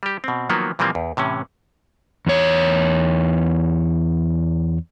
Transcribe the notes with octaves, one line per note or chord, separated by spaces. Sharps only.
G3 G4
B2 C4
D#3 F3 F#3 A#3 B3
A#2 E3 F3 G3 A#3 C4
E2
A2 C3 E3 C#4
E2 C#5